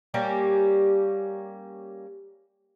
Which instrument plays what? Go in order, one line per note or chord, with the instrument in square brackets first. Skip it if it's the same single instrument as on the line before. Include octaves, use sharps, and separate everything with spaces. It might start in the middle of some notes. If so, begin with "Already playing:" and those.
[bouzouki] G3 A#3 C#4 G4